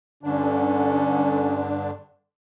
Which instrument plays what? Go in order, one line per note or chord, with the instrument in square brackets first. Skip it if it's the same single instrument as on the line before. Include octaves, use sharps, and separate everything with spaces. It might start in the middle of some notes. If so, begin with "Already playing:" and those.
[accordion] G2 D3 D4 [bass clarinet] C#4